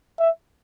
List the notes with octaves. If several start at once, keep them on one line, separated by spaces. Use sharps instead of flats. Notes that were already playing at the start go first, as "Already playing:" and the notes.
E5